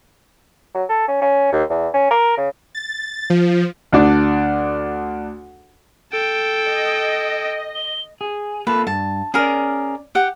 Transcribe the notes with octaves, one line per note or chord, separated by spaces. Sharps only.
F#3
A4
C#4
C#4
D#2
E2
C#4
A#4
C#3
A6
F3
D2 D4 D5
A4 G5 D7
D#5
G7
G#4
A#3 F4 A4 B4
G2 A5
C#4 G#4 A#4 D5
G4 F#5